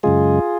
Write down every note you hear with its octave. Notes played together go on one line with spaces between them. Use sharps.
F#2 C#3 G#3 F4 G#4